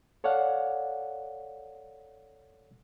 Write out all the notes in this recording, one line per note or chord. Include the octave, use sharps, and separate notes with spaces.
A4 C#5 D5 F5 F#5